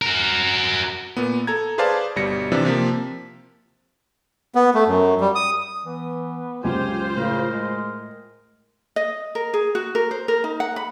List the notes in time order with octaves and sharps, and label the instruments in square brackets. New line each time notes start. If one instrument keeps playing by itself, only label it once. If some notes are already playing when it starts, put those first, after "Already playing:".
[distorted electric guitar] F#4 A#4
[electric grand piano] A#2 B3
A4 A#5 G#6
G#4 B4 C5 D5 F5 A5
G1 B2 G3 A#6 C#7
C3 E3 F3 D4
C3 F3 A#3
[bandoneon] B3
A3
F#2
G3
D#6
[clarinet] E3 [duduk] B3
[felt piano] C#2 F#2 [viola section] F4 C5 [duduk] G4 [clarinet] G#5
[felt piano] A2 [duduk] C#3 [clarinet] A#4
[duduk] G#3
[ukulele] D#5
A#4
G#4
F#4
A#4
C5
A#4
D#4
F#5
B5